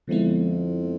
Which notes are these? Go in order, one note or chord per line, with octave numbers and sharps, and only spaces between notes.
F2 D3 F3 G#3 B3 E4